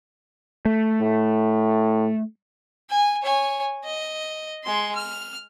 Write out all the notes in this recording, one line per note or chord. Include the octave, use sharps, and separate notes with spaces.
A3
A2
G#5
C#5 G#5
D#5
G#3 C6
F6